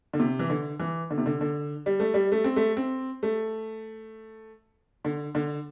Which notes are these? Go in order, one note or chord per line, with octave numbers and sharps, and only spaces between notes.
D3
C3
E3
D3
E3
D3
C3
D3
D3
G3
A3
G3
A3
C4
A3
C4
A3
D3
D3